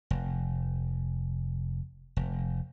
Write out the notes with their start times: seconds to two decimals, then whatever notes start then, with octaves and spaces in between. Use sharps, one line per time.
0.11 F1
2.17 F1